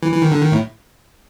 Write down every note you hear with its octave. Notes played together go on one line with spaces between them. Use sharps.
E3
E3
D#3
D3
D#3
A2